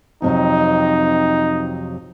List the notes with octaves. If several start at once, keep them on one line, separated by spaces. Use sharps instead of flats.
F2 C3 F#3 D#4